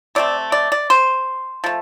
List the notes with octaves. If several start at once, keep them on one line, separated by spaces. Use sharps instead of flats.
C3 A3 C4 D5
D5
D5
C5
F3 A3